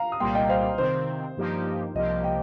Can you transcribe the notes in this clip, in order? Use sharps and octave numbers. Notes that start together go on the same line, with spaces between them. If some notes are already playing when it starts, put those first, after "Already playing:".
Already playing: F5 A#5
D#6
C2 A#2 G3 A#3 G5 C6
D#5 G5
C5 F5
C3 D#3 C4 C5
G2 F3 A#3 D#4 G4
C2 C3 F3 A#3 G4 D#5
D#5 G5